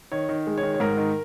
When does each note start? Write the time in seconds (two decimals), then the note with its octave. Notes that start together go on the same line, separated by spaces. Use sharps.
0.12 D#3 C#5
0.29 D#3
0.47 G#3
0.58 C#5
0.63 D#3
0.74 C#5
0.80 G#2 A#4
0.97 D#3